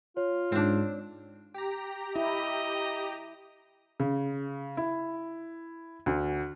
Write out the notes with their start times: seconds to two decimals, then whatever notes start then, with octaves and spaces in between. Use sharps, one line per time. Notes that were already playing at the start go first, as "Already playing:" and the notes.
0.17 F4 C#5
0.52 G#2 C4 D4
1.54 G4 A#5
2.16 E4 D#5
4.00 C#3
4.77 E4
6.06 D2